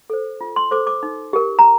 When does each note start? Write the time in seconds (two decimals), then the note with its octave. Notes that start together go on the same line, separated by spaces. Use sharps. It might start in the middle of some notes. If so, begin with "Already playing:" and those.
0.10 A4 C5
0.41 F4
0.56 C6
0.71 A4 C5 D6
0.87 D6
1.03 D#4
1.33 G4 A#4
1.59 A#5